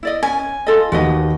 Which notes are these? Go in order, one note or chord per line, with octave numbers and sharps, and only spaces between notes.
E4 D5 D#5
C#4 G#5
F4 A4 D#5
D#2 F#4 B4 D#5